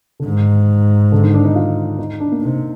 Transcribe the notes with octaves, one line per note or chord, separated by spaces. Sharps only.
D3
G#2 D#3
D3
D#3
D4
D#4
F4
D#4
D4
A#3
C3 D#4